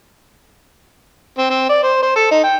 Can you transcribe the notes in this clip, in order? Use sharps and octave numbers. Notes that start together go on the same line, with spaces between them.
C4
C4
D5
C5
C5
A4
D#4
G5